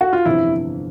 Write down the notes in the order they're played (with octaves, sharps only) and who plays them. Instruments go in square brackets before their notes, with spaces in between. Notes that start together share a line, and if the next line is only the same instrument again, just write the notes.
[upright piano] F#4
F4
[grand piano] G1 F2 C3 E3 [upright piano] E4